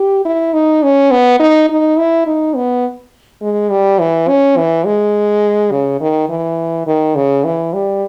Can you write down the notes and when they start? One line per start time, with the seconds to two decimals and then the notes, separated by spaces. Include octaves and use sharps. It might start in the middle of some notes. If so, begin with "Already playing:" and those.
Already playing: G4
0.25 E4
0.54 D#4
0.83 C#4
1.11 B3
1.40 D#4
1.70 D#4
1.97 E4
2.27 D#4
2.56 B3
3.42 G#3
3.71 G3
3.99 E3
4.28 C#4
4.57 E3
4.86 G#3
5.71 C#3
6.01 D#3
6.29 E3
6.87 D#3
7.16 C#3
7.44 E3
7.74 G3